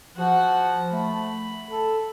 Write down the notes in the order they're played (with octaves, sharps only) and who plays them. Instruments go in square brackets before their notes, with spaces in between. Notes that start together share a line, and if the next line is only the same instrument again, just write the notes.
[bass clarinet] F3 [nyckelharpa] F#4 F#5
[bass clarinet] A3 [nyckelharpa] B5
[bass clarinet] A4